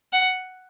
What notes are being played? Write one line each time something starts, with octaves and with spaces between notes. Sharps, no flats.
F#5